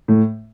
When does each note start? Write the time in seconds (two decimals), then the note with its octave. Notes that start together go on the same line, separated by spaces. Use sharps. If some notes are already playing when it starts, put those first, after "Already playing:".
0.08 A2